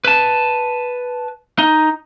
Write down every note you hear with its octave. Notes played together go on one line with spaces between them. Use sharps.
B4 A5
D#4